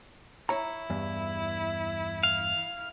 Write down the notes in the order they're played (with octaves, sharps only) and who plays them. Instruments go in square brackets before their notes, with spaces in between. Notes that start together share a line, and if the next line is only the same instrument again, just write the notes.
[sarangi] E4 [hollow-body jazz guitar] C#5 A#5
[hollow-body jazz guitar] E2 G2
[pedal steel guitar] F5